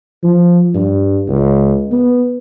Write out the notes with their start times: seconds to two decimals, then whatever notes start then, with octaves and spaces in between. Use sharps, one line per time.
0.23 F3
0.75 G2
1.28 C#2
1.92 B3